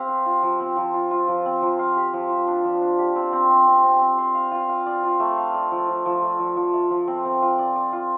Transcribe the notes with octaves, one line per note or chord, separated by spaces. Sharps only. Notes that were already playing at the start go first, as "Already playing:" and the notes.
Already playing: C4 G4 F5
C5
F4
F3
C4
F3
F4
F4
F3
C4
F3
F5
G4
F3
F3
D4
F3
D4
G4
C4
C4
C4
C4
C4
C4
C5
F5
F4
F5
D5
F4
A3
F5
D5
F3
F3
F3
A3
F3
F3
A3
F3
C4
C4
F4
D5
D5
F4